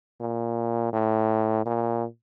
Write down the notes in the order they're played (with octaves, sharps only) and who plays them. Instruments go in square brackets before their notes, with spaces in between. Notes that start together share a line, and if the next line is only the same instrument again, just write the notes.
[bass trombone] A#2
A2
A#2